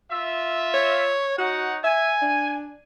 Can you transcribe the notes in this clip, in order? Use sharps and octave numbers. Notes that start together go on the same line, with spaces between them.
F4 E5
C#5
D#4 F#4 C#5 F#5
E5 G#5
D4